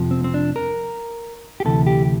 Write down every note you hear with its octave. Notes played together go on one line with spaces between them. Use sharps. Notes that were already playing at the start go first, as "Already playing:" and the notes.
Already playing: F2 C3 F3
C4
C4
D4
A#4
G4
D2 C3 E3 A4
G4